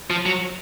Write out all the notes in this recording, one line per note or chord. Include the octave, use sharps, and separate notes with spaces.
F3
F#3